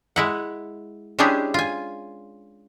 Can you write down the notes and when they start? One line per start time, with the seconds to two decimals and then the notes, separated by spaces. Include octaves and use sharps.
0.16 G#3 E4 F#5
1.19 G#3 C#4 D4 E4 G4 G#4
1.54 F4 G#5